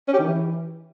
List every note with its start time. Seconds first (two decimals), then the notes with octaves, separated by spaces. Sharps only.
0.08 C#4
0.14 G4
0.19 D#3
0.25 E3